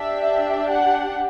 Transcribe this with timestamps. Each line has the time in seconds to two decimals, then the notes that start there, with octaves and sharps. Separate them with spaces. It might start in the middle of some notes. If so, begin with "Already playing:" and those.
Already playing: D4 G4 E5
0.68 F#5